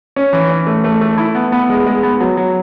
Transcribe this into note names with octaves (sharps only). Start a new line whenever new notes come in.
C#4
E3
C#4
A3
A3
A3
E4
B3
B3
G#3
G#3
B3
F#3
F#3